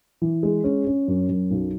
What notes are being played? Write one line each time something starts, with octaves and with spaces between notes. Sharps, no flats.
E3
G#3
C#4
C#4
F#2
F#2
B1